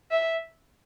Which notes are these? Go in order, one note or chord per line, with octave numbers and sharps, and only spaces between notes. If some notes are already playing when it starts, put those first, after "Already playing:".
E5